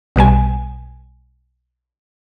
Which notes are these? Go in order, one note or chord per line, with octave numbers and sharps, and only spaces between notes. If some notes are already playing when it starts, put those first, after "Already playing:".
B1 B2 G3 G#5